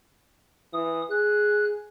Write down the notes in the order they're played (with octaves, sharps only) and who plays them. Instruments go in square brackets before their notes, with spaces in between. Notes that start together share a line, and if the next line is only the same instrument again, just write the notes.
[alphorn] E3 [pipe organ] D#6
[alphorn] G#4 [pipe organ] F#6